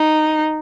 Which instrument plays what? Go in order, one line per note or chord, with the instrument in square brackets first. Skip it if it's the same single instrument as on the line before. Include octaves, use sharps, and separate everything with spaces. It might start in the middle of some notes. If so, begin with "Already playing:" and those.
Already playing: [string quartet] D#4